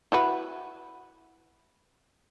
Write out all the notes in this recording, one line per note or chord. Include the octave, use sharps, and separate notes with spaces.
E4 F#4 B4